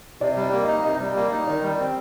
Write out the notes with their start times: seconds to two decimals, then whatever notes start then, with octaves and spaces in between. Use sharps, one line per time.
0.21 C3 D5
0.37 G3
0.42 D5
0.53 A#3
0.63 D#4 D#5
0.83 C3 D#5
1.00 G3
1.16 A#3
1.31 D#4
1.47 D#3 D5
1.63 G3
1.78 C4